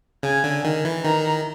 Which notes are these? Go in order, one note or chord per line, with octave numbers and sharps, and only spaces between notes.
C#3 G#5
D3
D#3
E3
D#3 A#5